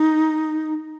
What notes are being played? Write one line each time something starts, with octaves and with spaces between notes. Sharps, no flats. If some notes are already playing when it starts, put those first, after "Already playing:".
Already playing: D#4